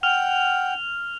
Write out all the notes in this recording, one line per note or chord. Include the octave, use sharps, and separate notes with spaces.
F#5 G5 F6 F7